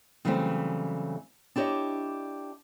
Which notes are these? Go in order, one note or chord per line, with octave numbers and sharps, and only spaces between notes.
C#3 E3 F#3 G3 A3 C4
D4 E4 G4 C#5 D#5